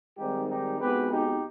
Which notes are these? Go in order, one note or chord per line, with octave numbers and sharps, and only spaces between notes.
G#2 D#3 G3 C4 D#4 G4
D#4 G4
B1 B2 G#3 C4 G4 B4
D#4 G4